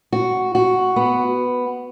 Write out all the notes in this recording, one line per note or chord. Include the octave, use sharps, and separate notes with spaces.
F#4
F#4
B3